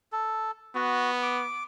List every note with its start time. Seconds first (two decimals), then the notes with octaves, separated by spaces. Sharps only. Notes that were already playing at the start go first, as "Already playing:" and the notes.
0.12 A4
0.75 B3 F#4
1.23 D6